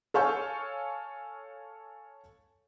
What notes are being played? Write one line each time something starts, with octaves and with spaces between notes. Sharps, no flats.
A4 C#5 F5 G#5 C#6 G6